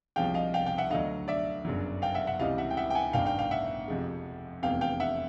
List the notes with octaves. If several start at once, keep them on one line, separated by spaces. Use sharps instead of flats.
C2 C3 F3 G#3 F5 G5
D#5 F5
F5 G5
F5 G5
E5 F#5
D2 D3 F#3 D#5 F5
D5 E5
G1 F#2 C#3 F#3
F5 G5
E5 F#5
E5 F#5
C#2 C3 E3 G3 D#5 F5
E5 F#5
G5
E5 F#5
G5
F#5 G#5
A1 G2 D#3 F5 G5
F5 G5
F5 G5
E5 F#5
F2 C3 F3 G#3
F1 E2 C3 F5 G5
F5 G5
E5 F#5